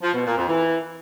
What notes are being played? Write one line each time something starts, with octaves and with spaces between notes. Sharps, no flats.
F3
B2
A#2
F2
E3